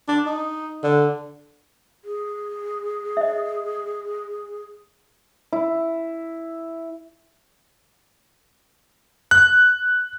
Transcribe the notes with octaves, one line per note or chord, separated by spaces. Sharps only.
D4
D#4
D3
G#4
D#5 E5
E4
F#6